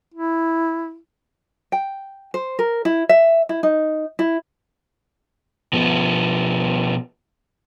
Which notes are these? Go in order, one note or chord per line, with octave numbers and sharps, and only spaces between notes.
E4
G5
C5
A#4
E4
E5
E4
D#4
E4
B2 F3 B3